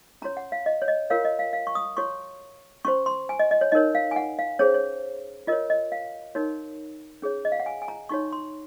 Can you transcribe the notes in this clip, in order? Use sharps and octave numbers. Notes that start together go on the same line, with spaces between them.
C#4 F#4 C#5 A#5
F#5
F5
D#5
C#5
D#5
F4 A#4 C#5 F5
D#5
F5
F5
C#6
D#6
F#4 C#5 C#6
C#4 F#4 C5 C#6
C6
G#5
D#5
D#5
C#5
D#4 A#4 C#5 D#5
F5
G#5
F#5
F5
C#4 G#4 C5 C#5
C#5
F4 A#4 C#5 D#5
D#5
F5
D#4 F#4 A#4 C#5
C#4 G#4 C#5
D#5
F5
F#5
G#5
G#5
A#5
D#4 F#4 C#5 C#6
C6